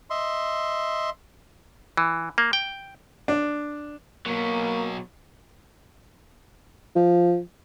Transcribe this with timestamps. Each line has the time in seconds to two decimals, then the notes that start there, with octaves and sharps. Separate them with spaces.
0.10 D#5 E5 C6
1.97 E3
2.38 A#3
2.53 G5
3.28 D4
4.26 B2 F#3 A#3
6.96 F3